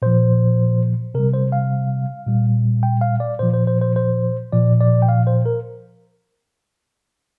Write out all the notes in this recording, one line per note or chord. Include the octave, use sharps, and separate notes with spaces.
A#2 F3 C5
C3 G3 A#4
C5
F5
A#2 G3
G5
F5
D5
A#2 F3 C5
C5
C5
C5
C5
A#2 F3 D5
D5
G5
F5
C5
A#4